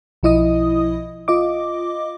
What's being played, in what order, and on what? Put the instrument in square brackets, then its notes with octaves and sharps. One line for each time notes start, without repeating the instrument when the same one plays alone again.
[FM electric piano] B1 F3 E4 D#5 D#6
F4 D#5 D6